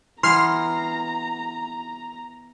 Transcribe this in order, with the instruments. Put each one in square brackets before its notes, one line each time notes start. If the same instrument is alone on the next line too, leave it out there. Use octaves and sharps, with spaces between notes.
[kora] E3 B3 [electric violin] A#5 [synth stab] C6 F6 C7